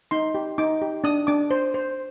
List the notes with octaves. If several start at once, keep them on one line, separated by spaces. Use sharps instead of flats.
D#4 C6
G4
D#4 D6
G4
D4 D#6
D4 D6
C5
C5